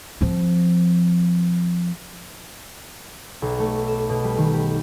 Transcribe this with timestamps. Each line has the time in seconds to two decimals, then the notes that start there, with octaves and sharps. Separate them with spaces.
0.21 F3 C4
3.42 B1
3.59 A3
3.88 E7
4.10 B2
4.24 G3
4.38 D#3
4.54 G4